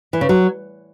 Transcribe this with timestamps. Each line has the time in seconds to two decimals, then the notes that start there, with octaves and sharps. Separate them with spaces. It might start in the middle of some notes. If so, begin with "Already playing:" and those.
0.13 E3
0.21 C#3
0.29 F#3